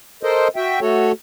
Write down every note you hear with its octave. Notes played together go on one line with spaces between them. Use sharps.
A4 A#4 C5 D#5
F#4 E5 G5
A3 F#4 A4 C#5